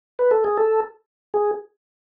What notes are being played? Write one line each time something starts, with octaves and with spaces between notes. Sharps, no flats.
B4
A4
G#4
A4
G#4